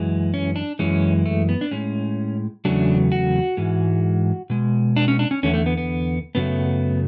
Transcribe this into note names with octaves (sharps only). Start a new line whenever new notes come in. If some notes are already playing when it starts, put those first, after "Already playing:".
Already playing: F#2 E3 G#3
C#4
D4
F#2 E3 G#3 C#4
A3
B3
D4
A2 G#3 C#4
E2 C#3 F#3 A3 D4
F#4
G#2 E3 G#3
B2 G#3
D4
C#4
D4
C#4
E2 D3 A3 C#4
A3
B3
B3
F#2 C#3 F#3 A3 B3